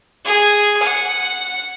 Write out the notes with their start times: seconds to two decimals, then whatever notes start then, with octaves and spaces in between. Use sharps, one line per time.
0.25 G#4
0.82 F#5